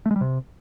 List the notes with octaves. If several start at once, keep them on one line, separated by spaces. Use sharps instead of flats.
A3
G#3
G3
C3